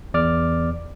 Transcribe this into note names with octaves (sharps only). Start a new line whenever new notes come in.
E2 D5 D6 F6